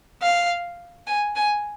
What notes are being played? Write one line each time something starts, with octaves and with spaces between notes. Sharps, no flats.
F5
G#5
G#5